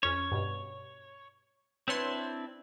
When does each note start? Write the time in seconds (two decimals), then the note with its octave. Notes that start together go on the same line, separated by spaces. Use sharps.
0.03 F2 C#4 C#5
0.31 G2 B2
1.88 C4 D4 E4 B4 C#5 C6